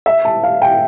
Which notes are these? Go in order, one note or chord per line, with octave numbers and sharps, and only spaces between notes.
E5
A5
F5
G5